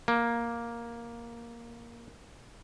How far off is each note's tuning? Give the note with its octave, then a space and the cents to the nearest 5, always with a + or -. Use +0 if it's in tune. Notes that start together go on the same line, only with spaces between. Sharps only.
A#3 +5